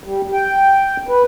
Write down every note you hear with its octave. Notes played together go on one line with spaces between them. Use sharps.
G3
G5
B4